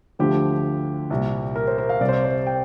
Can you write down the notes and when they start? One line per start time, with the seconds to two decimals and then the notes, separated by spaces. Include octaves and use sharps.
0.19 D2 D3 F3 G4
1.10 C2 A#2 G3
1.56 A#4
1.67 C5
1.78 A#4
1.89 F5
2.01 C2 C3 G3 D5
2.08 C5
2.13 D5
2.24 C5
2.47 G5